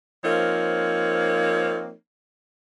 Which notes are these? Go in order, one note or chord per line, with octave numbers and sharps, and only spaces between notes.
F3 A#3 C4 D#4 C#5